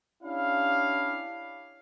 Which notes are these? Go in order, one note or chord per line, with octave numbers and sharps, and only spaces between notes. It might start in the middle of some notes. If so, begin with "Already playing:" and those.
C#4 D4 E4 G4 F5